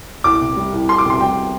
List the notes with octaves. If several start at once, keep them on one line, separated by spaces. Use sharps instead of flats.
C2 D6
C3
G3
C2
C2 C6
D6
C3
C6
G3 G5